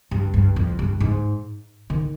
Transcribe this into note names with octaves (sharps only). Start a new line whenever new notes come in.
G2
G2
F2
G2
G#2
D#3